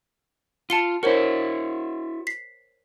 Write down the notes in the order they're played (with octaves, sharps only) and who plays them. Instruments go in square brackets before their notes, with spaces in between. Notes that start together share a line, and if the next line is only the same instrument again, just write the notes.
[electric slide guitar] F4 [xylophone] A5 C#7 G7
[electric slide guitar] E4 F#4 [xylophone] A#4 C5 C#5
[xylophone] B6 C7